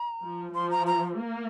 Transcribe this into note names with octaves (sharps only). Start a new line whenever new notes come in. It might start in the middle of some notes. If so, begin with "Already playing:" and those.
Already playing: A#5
F3
F3 C6
A#5
A#5
A#3